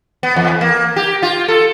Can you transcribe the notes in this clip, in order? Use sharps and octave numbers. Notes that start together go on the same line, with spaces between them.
B3
E2
A#3
G4
F4
A4